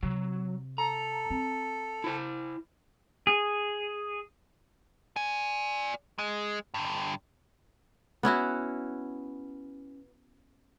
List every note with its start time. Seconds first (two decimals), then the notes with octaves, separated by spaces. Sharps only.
0.03 C3 F#3
0.78 A4 A#5
1.30 C4
2.04 E4 C5
3.27 G#4
5.16 D5 G#5
6.18 G#3
6.74 G2 D3
8.23 B3 C#4 E4 F#4